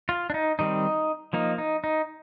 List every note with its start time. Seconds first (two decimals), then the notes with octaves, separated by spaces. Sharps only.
0.09 F4
0.30 D4
0.34 D#4
0.59 D#3 G3 C4 D#4
1.33 F3 A#3 D#4
1.58 D#4
1.84 D#4